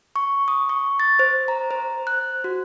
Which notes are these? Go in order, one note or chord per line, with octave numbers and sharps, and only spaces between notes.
C#6
D#6
C#6
A6
C5
A#5
C5
F#6
F#4